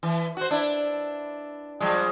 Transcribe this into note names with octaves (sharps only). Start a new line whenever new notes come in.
E3
F#4 C5
D4 E4
F3 G3 G#3